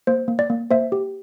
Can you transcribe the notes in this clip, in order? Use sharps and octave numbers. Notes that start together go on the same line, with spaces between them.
A#3 C5
A#3
D5
A#3
A#3 C5 E5
G4